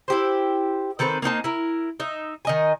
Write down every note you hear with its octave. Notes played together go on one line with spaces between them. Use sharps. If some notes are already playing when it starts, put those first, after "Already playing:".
E4 G4 C5
D#3 C4 A4 B4
A#3 C4 D#4 A5
E4 A#4
D#4 E5
D#3 D#5 G#5